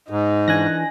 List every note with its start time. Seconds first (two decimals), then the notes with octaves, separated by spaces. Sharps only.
0.10 G#2 D#4
0.48 E3 D4 G#5 F#6 A#6